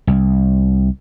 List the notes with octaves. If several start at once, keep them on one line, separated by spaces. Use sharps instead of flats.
C2